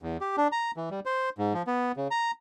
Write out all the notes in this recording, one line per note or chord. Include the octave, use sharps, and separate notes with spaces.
E2
G4
D4
A#5
E3
G3
C5
G#2
F3
B3
C#3
A#5